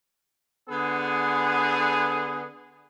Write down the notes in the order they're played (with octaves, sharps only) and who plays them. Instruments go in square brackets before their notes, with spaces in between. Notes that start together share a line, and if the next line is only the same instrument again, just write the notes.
[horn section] D3 B3 G#4